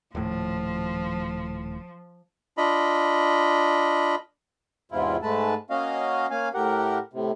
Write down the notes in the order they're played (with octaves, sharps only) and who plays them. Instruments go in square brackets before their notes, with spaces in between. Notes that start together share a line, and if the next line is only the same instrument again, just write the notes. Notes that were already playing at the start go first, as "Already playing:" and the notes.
[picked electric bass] D#1 A2 [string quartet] F3
[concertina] D4 F4 D#5 B5
[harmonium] E2 G#2 C3 E4 F4
G#2 G#3 A3 B4 A5
A#3 C#4 F#4 D#5 F5
A#3 C#4 F5 G#5
A2 G4 A#4 F#5
A2 C3